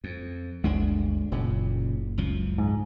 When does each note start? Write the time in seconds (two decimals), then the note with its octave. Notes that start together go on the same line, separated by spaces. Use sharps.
0.04 F2
0.64 G1 D2 G#3 D4
1.32 F#1 A#2 C#3
2.18 C#2 F#2 F3
2.58 G#2